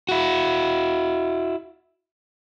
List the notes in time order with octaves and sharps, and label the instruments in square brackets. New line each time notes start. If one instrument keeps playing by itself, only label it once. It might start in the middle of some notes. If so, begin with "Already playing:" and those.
[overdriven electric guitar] E4 F#4